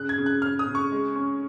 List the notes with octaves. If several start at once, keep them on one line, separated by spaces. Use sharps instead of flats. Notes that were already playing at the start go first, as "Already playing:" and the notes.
Already playing: C#3 F#6
G#6
C#3
F#6
C#3 F6
D#6
C#3
C#6
G#3
C#4